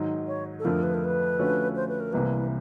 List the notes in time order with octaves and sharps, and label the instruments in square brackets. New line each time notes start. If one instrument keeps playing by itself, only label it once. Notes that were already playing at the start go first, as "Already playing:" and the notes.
Already playing: [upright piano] G#2 D#3 F#3
[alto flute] C#5
A4
[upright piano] F2 D3 F3 A3 [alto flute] A#4
[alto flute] B4
A#4
B4
[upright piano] D3 F3 A3 C#4 F#4
[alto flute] C5
B4
A#4
[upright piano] C2 C3 E3 G3 A#3 [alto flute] B4